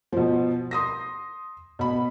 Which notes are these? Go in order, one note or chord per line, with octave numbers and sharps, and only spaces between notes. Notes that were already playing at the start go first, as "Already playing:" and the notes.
B2 F3
C6 D#6 A#6
B2 B5